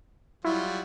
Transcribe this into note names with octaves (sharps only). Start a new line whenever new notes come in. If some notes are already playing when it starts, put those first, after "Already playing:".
F#3 G3 E4 F4